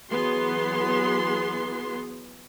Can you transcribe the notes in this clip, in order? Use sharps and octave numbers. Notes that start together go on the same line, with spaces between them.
E3 F#3 B3 G#4 C6